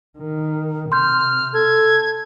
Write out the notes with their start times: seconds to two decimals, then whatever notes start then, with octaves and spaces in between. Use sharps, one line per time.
0.18 D#3
0.92 C3 C6 F6 G6
1.54 A4 G#6